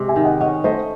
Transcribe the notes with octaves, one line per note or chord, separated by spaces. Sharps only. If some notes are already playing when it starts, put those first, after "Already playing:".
Already playing: C3 G#3
E5 G#5
D#3
D#5 F#5
C#4 D#5 F#5
A3 C5 D#5